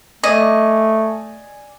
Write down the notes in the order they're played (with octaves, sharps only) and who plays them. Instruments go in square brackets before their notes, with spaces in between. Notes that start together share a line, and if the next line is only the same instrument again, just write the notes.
[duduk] A3 [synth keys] D5 G#5 [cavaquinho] D#5